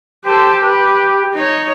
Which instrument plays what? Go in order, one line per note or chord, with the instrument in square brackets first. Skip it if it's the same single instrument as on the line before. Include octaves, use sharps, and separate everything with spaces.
[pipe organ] G4 [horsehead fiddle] A4 C5
[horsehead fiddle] B4
D#4 C#5